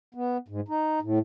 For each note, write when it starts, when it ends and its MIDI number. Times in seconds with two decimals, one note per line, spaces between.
0.14 0.37 59
0.48 0.60 44
0.68 0.99 63
1.02 1.19 45